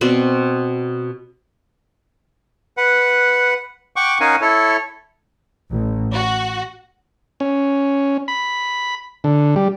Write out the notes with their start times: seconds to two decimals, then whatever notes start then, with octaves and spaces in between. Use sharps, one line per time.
0.01 B2 C4 D5
2.77 B4 F#5
3.96 F#5 G5 C#6 D6
4.21 C#4 D#4 A#4 F5 F#5 G#5
4.41 E4 A4 C#5
5.70 A1
6.13 F#4
7.40 C#4
8.28 B5
9.24 D3
9.56 G3